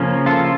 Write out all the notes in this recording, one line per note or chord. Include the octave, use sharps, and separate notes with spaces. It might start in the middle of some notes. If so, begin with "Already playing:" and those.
Already playing: C#3 F3 A#3 C#4
F4 A4